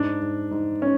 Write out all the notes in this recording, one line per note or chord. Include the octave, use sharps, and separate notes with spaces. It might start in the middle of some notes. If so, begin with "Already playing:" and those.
Already playing: G#2 D4
G#2
G#2
C#4